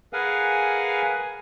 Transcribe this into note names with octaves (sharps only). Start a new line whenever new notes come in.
G#4 A#4 B4 F5 F#5 G#5